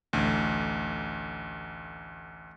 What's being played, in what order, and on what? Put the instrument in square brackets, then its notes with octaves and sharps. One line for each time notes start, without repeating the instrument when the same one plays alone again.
[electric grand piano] A1 D2